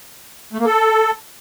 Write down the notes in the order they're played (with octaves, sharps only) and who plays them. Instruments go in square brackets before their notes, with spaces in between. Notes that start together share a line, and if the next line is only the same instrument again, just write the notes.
[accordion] A3
A#3
A4